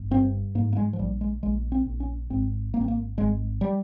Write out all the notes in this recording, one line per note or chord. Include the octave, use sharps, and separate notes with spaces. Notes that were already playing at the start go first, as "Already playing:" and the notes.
Already playing: G1
G2 C4
G#2 A#3
A#3
G#3
F3
A#1 G3
G#3
A#1 G#3
C4
A#1
C#4
G#1 C4
G#1 A#3
C4
A#3
G#1 G#3
G3